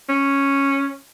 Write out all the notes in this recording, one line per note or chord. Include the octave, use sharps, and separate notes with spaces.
C#4